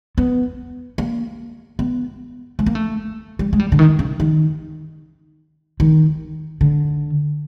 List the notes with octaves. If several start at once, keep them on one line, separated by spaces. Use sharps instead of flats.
B3
A#3
B3
A3
A#3
A3
G3
G#3
G3
D3
D#3
C#3
D#3
D#3
D3